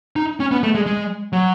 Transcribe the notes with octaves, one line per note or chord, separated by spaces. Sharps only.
D#4
C#4
B3
A3
G#3
G#3
F#3